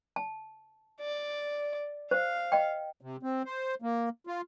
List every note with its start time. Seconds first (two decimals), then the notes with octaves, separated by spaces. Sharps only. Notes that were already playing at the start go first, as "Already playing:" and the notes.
0.16 A5
1.00 D5
2.11 C5 F5
2.52 D#5 G5
3.01 C3
3.23 C4
3.46 C5
3.82 A#3
4.27 F4